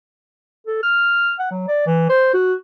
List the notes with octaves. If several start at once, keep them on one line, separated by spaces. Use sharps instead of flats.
A4
F6
F#5
F#3
D5
E3
C5
F#4